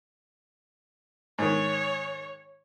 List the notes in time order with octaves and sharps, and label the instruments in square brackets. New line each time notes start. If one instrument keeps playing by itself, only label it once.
[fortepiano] G#2 D#3 [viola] C#5